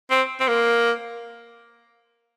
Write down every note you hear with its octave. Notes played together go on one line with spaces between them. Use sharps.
C4
C4
A#3